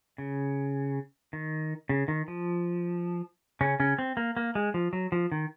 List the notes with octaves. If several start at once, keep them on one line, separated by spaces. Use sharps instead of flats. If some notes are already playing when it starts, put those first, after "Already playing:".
C#3
D#3
C#3
D#3
F3
C#3 C#4
C#3 C#4
C4
A#3
A#3
G#3
F3
F#3
F3
D#3